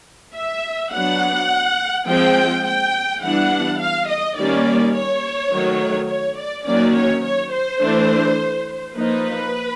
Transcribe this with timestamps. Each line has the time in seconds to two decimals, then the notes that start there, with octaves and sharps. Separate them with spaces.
0.35 E5
0.92 F#3 B3 D4 F#5
2.08 F3 G#3 C4 G5
2.65 G5
3.22 E3 G3 B3 D4 F#5
3.80 F5
4.08 D#5
4.37 D#3 G3 A#3 C#4 D5
4.95 C#5
5.52 D#3 F#3 A3
6.09 C#5
6.37 D5
6.66 D#3 F#3 A#3 C#4 D5
6.94 C#5
7.23 C#5
7.52 C5
7.80 E3 A3 D4
8.95 F3 A#3 D#4 B4